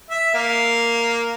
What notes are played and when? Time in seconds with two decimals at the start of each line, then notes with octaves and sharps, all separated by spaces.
0.10 E5
0.34 A#3